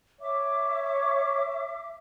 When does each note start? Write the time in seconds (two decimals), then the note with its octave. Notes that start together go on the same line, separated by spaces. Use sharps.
0.21 C#5 E5 D6